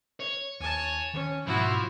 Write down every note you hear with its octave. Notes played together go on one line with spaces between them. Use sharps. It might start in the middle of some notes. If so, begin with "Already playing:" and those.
C#5
D#2 G#5 A5
D#3 C#4
G#2 B2 F3 E4 F#4